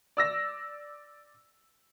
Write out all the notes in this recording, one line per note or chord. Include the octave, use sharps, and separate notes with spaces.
D5 E6 A#6